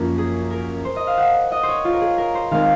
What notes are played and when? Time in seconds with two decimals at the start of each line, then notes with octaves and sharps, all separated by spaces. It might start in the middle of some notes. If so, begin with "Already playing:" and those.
Already playing: F#2 F3 A#3
0.18 G#4
0.51 A#4
0.85 C5
0.96 D#5
1.07 F5
1.18 F#5
1.52 D#5
1.63 C5
1.68 C#5
1.85 F4
1.93 A#4
2.01 G#4
2.18 A#4
2.35 C5
2.51 D#3 G#3 C4 F5